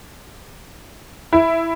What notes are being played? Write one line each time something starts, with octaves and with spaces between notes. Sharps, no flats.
E4